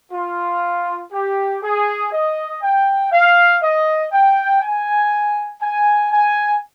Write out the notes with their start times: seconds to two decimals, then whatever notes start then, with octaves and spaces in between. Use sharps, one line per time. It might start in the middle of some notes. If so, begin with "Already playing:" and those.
0.12 F4
1.13 G4
1.63 G#4
2.12 D#5
2.62 G5
3.12 F5
3.62 D#5
4.12 G5
4.62 G#5
5.62 G#5
6.11 G#5